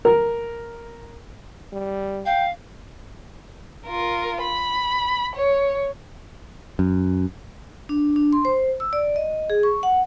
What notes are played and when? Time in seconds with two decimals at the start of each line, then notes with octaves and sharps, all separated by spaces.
0.05 A#4
1.73 G3
2.26 F5 G5
3.87 F4 A#4
4.42 B5
5.36 C#5
6.79 F#2
7.89 D4
8.16 D4
8.33 C6
8.45 C5
8.80 E6
8.93 D5
9.16 D#5
9.50 G#4
9.63 C#6
9.83 F#5